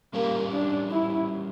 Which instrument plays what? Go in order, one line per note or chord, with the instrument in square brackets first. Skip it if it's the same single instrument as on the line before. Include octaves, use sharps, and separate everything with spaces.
[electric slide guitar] G3 C#4 G4 A#4 [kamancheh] A#3
[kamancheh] D4
E4